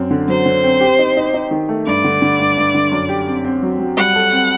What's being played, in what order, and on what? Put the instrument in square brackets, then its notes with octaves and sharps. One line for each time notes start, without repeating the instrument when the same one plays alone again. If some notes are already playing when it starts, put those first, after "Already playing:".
Already playing: [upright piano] F#2 C4
D3
[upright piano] F#3 [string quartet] C5
[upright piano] D3
C4
G4
D#4
D#4
D#4
D#3
A3
[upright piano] G2 [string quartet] D5
[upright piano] D3
D3
G2
G2
D3
F#2
G4
C4
C4
F#3
F#3
[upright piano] G3 [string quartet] F#5
[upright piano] A4
C4